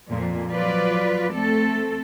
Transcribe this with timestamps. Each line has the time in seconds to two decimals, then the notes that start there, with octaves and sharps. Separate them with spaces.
0.10 F2 A#2
0.51 F3 F#3 F4 B4 D5
1.32 A3 C4 A4